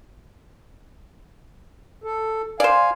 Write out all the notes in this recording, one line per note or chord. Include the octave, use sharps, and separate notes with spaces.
A4
C5 D5 F5 G#5